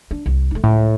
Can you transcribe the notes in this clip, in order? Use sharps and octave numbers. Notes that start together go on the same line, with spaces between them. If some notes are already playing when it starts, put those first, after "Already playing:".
D4
C2
A3 D#4
C#2 A2